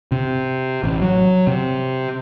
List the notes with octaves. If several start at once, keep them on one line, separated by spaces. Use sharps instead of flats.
C3
A1
F#3
C3